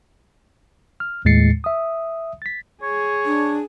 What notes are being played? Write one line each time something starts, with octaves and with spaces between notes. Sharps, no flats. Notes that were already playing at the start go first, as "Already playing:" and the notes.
F6
D#2 A2 G#3 A6 C7 C#7
E5 D#6
A6 B6
G#4 C#5
D4